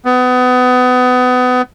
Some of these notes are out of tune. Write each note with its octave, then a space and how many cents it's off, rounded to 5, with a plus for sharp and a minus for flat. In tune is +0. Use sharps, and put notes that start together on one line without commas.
B3 +25